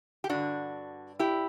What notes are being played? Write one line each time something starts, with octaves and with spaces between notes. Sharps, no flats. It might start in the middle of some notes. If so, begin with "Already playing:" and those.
G4
G2 D3 D4 F#4
E4 G4